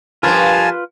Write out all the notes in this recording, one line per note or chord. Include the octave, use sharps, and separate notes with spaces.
G2 F3 F4 A#4 B4 G#5 A5 C6